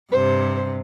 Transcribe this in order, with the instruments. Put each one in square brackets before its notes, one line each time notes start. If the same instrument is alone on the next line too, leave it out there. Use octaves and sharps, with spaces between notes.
[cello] G2 C3 [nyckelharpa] C5